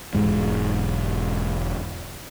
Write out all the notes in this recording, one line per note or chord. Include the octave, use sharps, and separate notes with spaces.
E1 G#2 G#3